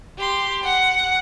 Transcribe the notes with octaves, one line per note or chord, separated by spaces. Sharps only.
G4 C6
F#5